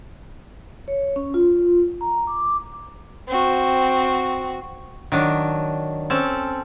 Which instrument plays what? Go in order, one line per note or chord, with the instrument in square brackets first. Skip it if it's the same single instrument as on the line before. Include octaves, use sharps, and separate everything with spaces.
[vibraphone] C#5
C#4
F4
A#5
D6
[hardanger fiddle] C4 F#4
[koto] D#3 F#3 D4
C4 C#4 A4 A5